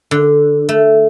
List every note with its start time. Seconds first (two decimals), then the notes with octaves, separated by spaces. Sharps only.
0.11 D3
0.69 A3